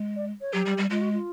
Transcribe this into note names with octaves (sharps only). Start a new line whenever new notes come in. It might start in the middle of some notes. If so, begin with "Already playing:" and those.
Already playing: G#3
D5
C#5
F#3 G4
G3
G3
G#3 F4
F#4
F4